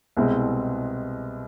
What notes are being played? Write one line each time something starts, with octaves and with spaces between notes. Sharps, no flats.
C2 B2 G#3 C4 E4